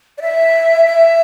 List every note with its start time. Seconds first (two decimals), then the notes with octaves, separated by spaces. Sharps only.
0.18 D5
0.22 E5
0.85 E5